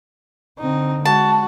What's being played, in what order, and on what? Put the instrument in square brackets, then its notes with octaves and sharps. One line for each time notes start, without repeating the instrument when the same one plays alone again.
[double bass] D3 C4 [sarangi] D#4
[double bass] G#3 [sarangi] F#4 [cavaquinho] A5